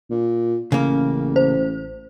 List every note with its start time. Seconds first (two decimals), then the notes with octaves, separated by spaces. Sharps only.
0.11 A#2
0.72 A1 C#3 A#3
1.36 C5